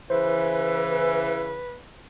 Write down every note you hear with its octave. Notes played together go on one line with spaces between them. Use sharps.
C#3 E3 B4 C5